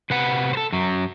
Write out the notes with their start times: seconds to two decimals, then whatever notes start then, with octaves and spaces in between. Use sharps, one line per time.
0.10 C3 B4 F#5
0.53 A4 C5
0.72 F#2 F#3